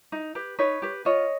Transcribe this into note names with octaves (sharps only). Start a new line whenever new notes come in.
D#4
G4 B4
D#4 B4 C#5
G4 B4
F4 C#5 D#5